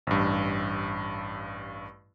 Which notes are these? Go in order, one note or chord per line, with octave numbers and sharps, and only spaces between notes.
A1 G2